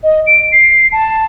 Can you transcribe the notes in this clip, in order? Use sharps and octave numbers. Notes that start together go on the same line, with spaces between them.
D#5
D7
C7
A5